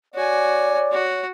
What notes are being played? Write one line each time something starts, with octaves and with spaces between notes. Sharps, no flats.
F#4 C#5 D5 G#5
F#4